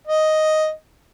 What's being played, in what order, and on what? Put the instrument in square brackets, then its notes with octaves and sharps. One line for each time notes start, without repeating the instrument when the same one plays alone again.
[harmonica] D#5